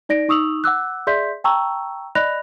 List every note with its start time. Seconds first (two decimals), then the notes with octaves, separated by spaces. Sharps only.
0.09 D#4 D5 A#6 D7
0.28 D#4 C#6 D#6 E6 F7 F#7
0.64 F#5 D6 E6 F#6
1.07 G#4 D5 E5 C6 G6 B6
1.44 G5 A5 A#5 C#6 E6
2.15 D5 D#5 B5 F#6 A#6 F7